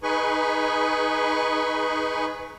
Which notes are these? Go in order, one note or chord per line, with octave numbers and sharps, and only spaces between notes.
D#4 G#4 B4 G#5 B5 C#6